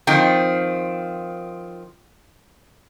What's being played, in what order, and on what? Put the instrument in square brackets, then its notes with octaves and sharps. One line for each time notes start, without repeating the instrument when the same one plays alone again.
[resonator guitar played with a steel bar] D#3 F3 C4